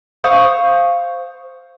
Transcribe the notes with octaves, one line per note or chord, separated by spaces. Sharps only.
C5 F5 C#6 D#6